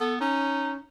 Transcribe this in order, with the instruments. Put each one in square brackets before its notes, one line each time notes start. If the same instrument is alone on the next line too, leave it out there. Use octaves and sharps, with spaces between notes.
[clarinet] B3 [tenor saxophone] A4
[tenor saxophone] C#4 [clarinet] D#4